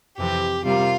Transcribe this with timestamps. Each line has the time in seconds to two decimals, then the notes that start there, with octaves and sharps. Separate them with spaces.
0.17 F2 C3 E3 G4
0.64 C3 G3 A#3 F4